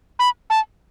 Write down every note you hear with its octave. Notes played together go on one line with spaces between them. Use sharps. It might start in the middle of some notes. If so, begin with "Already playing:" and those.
B5
A5